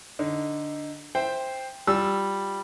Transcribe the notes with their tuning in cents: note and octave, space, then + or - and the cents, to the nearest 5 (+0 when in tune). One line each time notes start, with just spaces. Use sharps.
D3 +0 D#4 +0
C5 +0 E5 +0 G5 +10
G3 +0 F4 +10 E6 +0